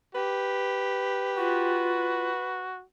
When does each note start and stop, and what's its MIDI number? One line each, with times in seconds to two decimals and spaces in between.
0.15 1.94 67
0.15 2.70 71
1.37 2.30 65
1.37 2.82 66